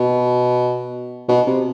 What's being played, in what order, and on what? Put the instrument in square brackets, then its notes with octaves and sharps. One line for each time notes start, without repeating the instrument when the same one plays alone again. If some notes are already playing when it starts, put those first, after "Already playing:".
Already playing: [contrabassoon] B2
B2
C3